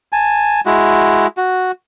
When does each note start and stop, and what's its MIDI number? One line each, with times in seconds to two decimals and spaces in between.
0.13 0.61 80
0.13 0.61 81
0.66 1.27 56
0.66 1.27 64
0.66 1.27 66
1.37 1.72 66